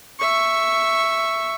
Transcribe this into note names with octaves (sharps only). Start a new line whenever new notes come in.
E5 C#6